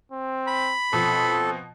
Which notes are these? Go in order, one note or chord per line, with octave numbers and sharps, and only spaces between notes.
C4
B5
B2 F3 C4 A4